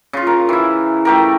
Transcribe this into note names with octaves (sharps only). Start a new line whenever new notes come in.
C#3 F4
A#4
E3 E4
A3 G4 A#4